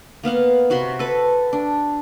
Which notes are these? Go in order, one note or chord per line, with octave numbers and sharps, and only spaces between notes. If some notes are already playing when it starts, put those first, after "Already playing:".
A#3 B3 F5 F#5
C3 F#4 B5 C6
A4 B4
D4